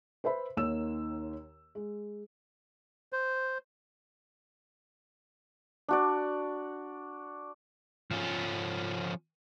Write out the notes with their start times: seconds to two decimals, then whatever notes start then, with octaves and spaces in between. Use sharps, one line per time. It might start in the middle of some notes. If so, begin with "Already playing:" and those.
0.24 B4 C5 E5 B5
0.57 D#2 D#3 A#3 C#5 E6 E7
1.75 G#3
3.13 C5
5.88 D4 F#4 D5
8.11 F3 C#4